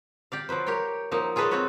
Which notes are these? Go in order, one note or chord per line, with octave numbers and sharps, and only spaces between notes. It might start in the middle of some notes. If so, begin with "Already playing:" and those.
G4 D5 F5
F3 F#3 B4 C5
G4 A#4 C#5 G5
F3 F#3 A#3 D#4
F4 G#4 A4 B4 C#5 D#5
C4 F4 F#4 B4 C#5